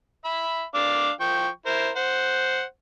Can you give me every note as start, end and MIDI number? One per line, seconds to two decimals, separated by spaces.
0.25 0.63 76
0.25 0.63 83
0.75 1.10 62
0.75 1.10 77
0.75 1.10 86
1.20 1.48 53
1.20 1.48 79
1.20 1.48 85
1.66 1.89 64
1.66 1.89 70
1.66 1.89 72
1.96 2.63 72
1.96 2.63 78